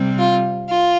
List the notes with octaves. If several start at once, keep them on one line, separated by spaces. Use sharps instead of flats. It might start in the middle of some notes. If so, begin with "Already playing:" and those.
Already playing: C3 G3 C4
F4
F4